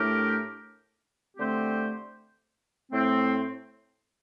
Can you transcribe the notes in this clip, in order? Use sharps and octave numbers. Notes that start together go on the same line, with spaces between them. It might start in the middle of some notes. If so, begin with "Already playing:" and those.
Already playing: A2 A3 D4 G4 A#4
D3 A3 C4 G4 C5
A2 A3 C4